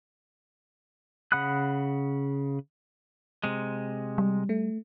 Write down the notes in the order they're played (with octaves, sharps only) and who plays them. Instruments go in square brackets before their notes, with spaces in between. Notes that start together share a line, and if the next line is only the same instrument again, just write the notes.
[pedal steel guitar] C#3 F#5 B5 D#6 F#6
[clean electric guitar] C3 G#3
[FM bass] G3
[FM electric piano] A3